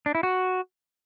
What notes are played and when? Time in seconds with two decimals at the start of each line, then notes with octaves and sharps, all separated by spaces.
0.06 D4
0.15 E4
0.23 F#4